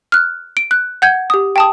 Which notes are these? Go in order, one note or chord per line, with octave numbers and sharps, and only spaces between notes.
F6 F#6
D7
F#6
F#5 G6 G#6
G4 D#6
G5 A5 D#6